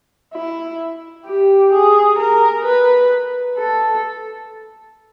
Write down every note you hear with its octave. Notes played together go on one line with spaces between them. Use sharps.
E4
G4
G#4
A#4
B4
A4